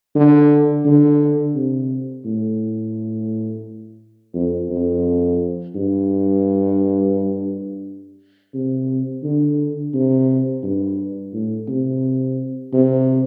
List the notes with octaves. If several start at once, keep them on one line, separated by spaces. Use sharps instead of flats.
D3
D3
C3
A2
F2
F2
G2
C3
D3
C3
G2
A2
C3
C3